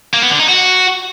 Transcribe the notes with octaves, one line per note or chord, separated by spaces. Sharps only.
A#3
B3
D3
D#4
F#4